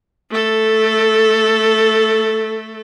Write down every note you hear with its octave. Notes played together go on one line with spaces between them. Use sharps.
A3 A4